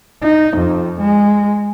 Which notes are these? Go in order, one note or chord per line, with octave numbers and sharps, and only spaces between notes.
D#4
F2
G#3